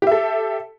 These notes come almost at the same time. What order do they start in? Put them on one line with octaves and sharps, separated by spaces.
G4 E5 A4